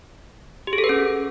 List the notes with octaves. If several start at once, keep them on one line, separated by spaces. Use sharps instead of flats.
G4
G#4
A4
B4
C#4